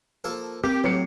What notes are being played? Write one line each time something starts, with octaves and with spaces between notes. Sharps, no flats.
F3 A#3 A4
A#3 C4 G4
A2 F#3 C7 C#7